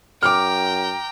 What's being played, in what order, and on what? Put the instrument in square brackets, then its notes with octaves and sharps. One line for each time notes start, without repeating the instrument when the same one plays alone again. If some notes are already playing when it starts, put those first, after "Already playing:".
[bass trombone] F#2 [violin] G5 A#5 [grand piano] D6 F6